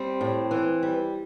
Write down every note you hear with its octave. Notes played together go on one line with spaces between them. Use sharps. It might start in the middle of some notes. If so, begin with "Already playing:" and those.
Already playing: G3 C4
A2
E3
G3